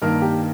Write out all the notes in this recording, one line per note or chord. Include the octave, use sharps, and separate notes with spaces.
G2 D#3 A#3 A#4
G4